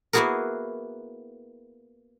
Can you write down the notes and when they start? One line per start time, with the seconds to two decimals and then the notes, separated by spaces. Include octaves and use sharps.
0.13 A#3 B3 E4 F#4 G#4 A#4